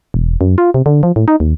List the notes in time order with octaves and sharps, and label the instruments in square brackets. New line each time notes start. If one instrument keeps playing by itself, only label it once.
[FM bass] E1
F#2
F4
C3
D3
F3
A2
D#4
D#2